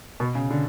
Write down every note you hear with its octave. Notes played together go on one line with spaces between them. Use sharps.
B2
C#3
D3